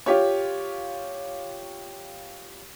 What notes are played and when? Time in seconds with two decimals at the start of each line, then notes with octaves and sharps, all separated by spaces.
0.06 F4 G4 C#5